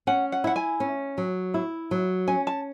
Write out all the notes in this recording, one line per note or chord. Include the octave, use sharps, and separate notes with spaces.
C#4 F#5
F#5
E4 F#5
G#5
C#4
F#3
E4
F#3
C#4 G#5
A5